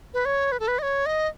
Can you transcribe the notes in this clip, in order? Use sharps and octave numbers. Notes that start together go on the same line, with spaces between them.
B4
C#5
B4
A4
B4
D#5
C#5
D#5